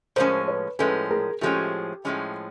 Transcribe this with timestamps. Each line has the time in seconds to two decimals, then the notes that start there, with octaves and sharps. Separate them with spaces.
0.16 A2 F3 G#3 C#4 A#4 C5
0.48 B4 C#5
0.79 A2 F3 G#3 C#4 A4 B4
1.11 G#4 A#4
1.41 A2 F3 G#3 C#4 G4 A4
2.05 A2 F3 G#3 C#4